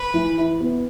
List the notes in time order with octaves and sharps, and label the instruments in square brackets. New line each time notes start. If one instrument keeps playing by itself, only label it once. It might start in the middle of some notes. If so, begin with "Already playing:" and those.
Already playing: [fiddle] B4
[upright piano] E3
E4
B3